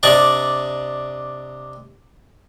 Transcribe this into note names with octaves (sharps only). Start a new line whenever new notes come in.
C3 D4 D5 D#5 C#6